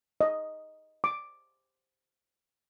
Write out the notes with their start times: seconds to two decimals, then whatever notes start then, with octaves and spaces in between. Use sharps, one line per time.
0.21 D#5
1.04 D6